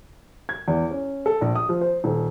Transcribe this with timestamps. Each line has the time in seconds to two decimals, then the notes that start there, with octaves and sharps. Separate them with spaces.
0.49 G#6
0.68 E2
0.91 C#4
1.26 A4
1.41 A#1
1.55 D#6
1.69 F3
1.81 C5
2.04 D#1